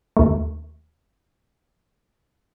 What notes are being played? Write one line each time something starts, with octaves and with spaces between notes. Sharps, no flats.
D#2 A3